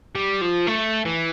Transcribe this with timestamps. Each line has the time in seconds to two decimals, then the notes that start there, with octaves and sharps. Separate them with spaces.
0.15 G3
0.41 F3
0.67 A3
1.05 E3